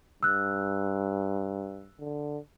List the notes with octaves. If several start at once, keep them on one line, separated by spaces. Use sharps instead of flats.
G2 E6 F#6
D3